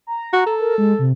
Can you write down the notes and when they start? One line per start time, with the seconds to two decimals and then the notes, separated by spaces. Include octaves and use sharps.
0.07 A#5
0.33 F#4
0.46 A4
0.60 A#4
0.78 G#3
0.99 C3